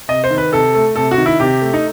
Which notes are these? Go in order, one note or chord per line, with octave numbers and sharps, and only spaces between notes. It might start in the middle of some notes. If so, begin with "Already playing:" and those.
C3 D#5
C5
D#3
B4
C3 A4
A3
C3 A4
F#4
D#3
E4
C3 G4
A3
D#4